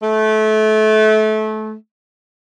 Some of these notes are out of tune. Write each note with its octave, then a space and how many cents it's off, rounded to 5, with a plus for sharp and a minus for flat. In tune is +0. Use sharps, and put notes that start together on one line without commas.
A3 -25